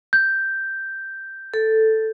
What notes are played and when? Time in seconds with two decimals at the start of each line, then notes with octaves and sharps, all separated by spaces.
0.13 G6
1.54 A4